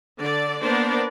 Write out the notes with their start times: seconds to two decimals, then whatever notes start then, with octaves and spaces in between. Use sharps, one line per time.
0.18 D3 D5
0.63 A#3 B3 D4 A#4 C5 D5